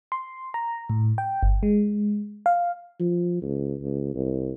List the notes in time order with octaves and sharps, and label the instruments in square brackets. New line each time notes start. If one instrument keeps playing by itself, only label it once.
[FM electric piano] C6
A#5
A2
G5
G1
G#3
F5
[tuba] F3
C#2
C#2
C2